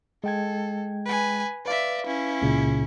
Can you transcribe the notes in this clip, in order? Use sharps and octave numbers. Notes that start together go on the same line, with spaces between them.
G#3 A4 G5 G#6
B4 G#5
B4 D5 E5 F5
C#4 E4
C#2 A#2 C#3